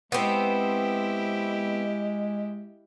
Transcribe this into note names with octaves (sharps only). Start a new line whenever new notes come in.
G#3 B3 C4 E4 G4